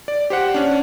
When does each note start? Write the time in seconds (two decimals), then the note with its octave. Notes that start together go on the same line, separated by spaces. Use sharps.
0.08 D5
0.30 G4 C5 F#5
0.54 C#4 D4